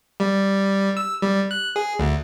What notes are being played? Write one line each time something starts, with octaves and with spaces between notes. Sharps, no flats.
G3
E6
G3
F#6
G#4
D2